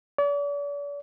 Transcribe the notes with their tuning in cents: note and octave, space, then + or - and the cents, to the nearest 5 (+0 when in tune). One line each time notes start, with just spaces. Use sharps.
D5 -45